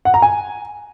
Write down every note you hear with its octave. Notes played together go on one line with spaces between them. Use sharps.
F#5
A#5
G#5